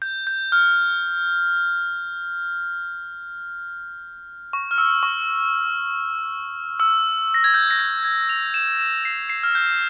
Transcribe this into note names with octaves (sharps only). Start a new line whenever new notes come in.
G6
G6
F6
C#6
F6
E6
C#6
E6
A#6
G#6
G6
A#6
G#6
G#6
F7
E7
E7
C7
C7
F6
G6